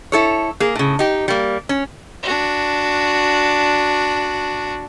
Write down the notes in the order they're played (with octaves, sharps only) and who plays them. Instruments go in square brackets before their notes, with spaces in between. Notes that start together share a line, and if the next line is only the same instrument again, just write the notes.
[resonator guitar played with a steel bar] E4 A4 C#5
A#3 G#4
A2 C#3
D#4 G4
G3 A#3
C#4
[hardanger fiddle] D4 F#4